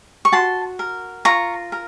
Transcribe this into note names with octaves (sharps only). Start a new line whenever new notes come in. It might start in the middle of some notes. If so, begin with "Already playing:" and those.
C#6
F#4 A5 C6
A#4
F4 A#5 C#6
A#4